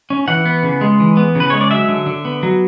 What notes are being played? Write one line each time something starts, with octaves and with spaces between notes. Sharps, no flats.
C#4
E3 F#5
B3
C#3
G#3
E3
B3
C#3 B4
G#3 C#5
D5
F#3 E5
D3
D3
B3
F#3